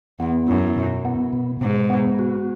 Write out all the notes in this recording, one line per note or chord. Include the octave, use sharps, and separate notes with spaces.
E2 B3
F#2 E4
B2
B3
B2
G#2 B2
B3
F#4